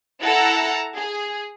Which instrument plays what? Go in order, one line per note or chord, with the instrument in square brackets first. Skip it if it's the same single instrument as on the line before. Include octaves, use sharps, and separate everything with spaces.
[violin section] E4 A4 F#5 A5 A#5 E6
G#4